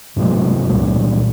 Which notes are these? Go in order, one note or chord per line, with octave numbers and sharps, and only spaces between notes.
G#2 C3 F#3 A3
C#2 A#2 G3 A3